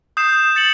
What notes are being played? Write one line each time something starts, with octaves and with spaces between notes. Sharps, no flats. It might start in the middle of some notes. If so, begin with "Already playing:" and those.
D#6 G6 C7 E7
A6 C#7 F#7